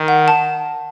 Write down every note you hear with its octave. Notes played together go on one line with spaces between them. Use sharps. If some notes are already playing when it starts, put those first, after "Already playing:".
Already playing: D#3
F#5
A5